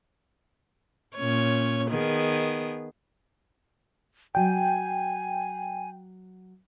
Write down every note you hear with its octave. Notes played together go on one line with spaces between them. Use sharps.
A#2 C#4 C#5
D#3 B3 G#4
F#3 D5 G5 G#5